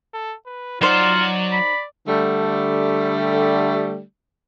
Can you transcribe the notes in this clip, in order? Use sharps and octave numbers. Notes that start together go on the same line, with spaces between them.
A4
B4
F#3 D#4 F4 C5 D5 F#5
D5
B5
D3 G3 A3